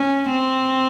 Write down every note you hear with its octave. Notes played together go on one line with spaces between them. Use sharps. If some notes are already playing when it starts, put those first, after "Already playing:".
Already playing: C#4
C4